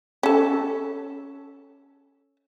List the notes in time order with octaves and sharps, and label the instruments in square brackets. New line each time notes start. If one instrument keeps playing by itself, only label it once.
[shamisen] C#4 A4